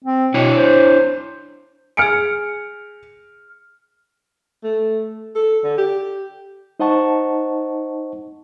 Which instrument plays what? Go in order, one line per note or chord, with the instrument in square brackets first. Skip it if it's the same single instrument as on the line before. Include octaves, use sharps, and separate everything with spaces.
[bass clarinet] C4
[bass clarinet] B2 [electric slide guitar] D4 E4 C#5
[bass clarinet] C5
[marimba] G#4 G#5 [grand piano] F6 C#7 D7
[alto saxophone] A3
A4
D3
G4
[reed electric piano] D#4 C5 D#5 F#5 A5 C#6